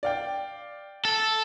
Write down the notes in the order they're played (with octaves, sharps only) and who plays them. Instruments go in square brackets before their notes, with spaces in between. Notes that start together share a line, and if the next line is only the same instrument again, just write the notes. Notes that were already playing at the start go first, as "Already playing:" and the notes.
[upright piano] D5 F5 G5
[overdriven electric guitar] A4